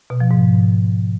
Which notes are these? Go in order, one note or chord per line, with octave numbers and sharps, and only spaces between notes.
B2
F3
G#2